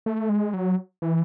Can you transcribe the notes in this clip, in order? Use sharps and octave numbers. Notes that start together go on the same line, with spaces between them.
A3
G#3
F#3
E3